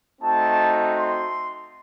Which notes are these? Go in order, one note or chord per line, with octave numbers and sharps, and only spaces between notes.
A3 C4 D#4 F#4 A5
C6